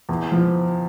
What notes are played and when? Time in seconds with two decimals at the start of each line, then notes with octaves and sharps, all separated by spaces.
0.09 E2
0.32 F3